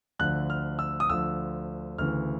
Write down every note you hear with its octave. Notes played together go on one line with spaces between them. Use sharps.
D2 D3 F3 F#6
F6
E6
D#6
D2 D3 F3 E6
D2 C#3 E3 F6